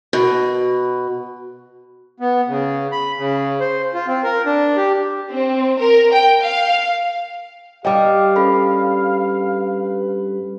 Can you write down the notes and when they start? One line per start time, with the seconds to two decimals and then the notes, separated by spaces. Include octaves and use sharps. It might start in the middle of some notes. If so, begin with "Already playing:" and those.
0.13 B2
2.20 B3
2.48 C#3
2.92 B5
3.18 C#3
3.60 C5
3.94 F4
4.07 C4
4.24 A#4
4.46 D4
4.77 G4
5.31 C4
5.78 A#4
6.13 G5
6.43 F5
7.85 G2 G3 G4 D#5 F5 G5 D6
8.36 C#4 A4 B4 B5